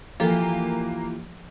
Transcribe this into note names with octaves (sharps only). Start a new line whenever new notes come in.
E3 F3 A#3 F4 G4 A4